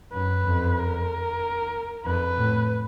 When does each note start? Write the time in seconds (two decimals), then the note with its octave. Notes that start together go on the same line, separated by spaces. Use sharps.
0.14 F#2 B4
0.46 F2
0.78 A#4
2.05 F2 B4
2.38 A2